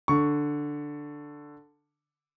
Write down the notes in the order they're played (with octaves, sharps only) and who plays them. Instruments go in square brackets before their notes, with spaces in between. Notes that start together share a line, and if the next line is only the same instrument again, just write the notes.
[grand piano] D3 C#6